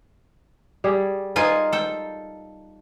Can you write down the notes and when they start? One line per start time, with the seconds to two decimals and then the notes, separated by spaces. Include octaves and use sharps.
0.84 G3 G#4
1.36 D#4 F4 A#4 G#5
1.72 A4 G5